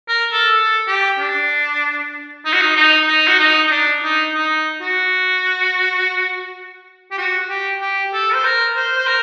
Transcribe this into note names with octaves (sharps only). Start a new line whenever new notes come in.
A#4
A4
A4
G4
D4
D#4
F#4
D#4
D#4
D#4
F#4
D#4
D#4
D4
D#4
D#4
F#4
G4
F#4
G4
G4
A4
C5
A#4
C5
C5
A#4